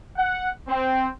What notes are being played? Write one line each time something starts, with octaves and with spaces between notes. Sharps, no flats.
F#5
C4